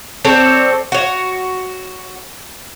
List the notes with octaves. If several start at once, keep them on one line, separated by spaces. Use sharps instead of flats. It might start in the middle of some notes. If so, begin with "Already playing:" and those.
C4 A4 C#5 D5
F#4 C#5